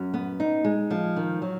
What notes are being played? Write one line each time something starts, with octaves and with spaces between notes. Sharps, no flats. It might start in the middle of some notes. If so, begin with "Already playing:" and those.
Already playing: F#2
B3
D#4
G#3
F3
D#3
F#3